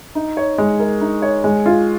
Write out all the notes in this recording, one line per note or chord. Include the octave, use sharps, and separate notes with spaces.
D#4
C#5
G#3
A#4
D#4
C#5
G#3
F4